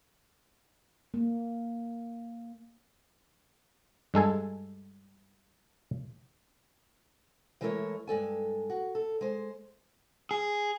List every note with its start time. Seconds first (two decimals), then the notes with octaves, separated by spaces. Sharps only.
1.14 A#3
4.14 G2 G#3 A4 G#5
7.61 E3 G#3 A3 E4 A#4 C#5
8.07 G2 G#3 A4 G#5
8.70 F#4
8.95 A4
9.21 G#3 C5
10.31 G#4